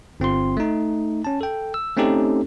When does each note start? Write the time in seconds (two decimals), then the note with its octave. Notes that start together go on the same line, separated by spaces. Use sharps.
0.20 G1 C4 F4 C6
0.57 A3 D#4
1.25 C#4 A5
1.41 A4 G5
1.74 E6
1.97 A3 C4 C#4 D#4 G4 A4